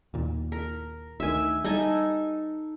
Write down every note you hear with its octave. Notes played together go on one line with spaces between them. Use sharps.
D#2 A#2
A#4
D2 D#3 E5 G#5
G3 D#4 A4 G#5